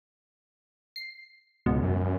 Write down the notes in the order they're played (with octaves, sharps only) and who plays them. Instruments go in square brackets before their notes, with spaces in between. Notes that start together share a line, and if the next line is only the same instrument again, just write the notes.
[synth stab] C7
[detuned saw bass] C#2 [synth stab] G#2 B2
[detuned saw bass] F#2